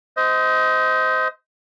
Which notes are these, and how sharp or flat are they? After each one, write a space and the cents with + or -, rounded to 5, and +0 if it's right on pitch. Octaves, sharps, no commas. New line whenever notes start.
C5 -20 D#5 +25